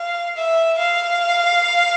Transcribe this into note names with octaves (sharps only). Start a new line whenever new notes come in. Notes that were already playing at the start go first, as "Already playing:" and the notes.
Already playing: F5
E5
F5